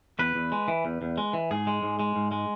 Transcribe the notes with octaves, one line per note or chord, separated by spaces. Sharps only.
E2 B4
E2
G#3
E3
E2
E2
G#3
E3
G#2 G#4
G#3
G#2
G#3
G#2
G#3